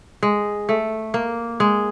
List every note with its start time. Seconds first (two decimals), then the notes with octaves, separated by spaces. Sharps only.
0.23 G#3
0.69 A3
1.14 A#3
1.60 G#3